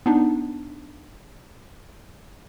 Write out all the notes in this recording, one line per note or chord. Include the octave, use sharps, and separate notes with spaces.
B3 D4 D#4